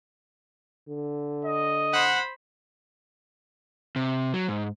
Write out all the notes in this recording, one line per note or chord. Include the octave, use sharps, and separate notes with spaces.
D3
D#5
C5 F#5 B5
C3
F#3
G#2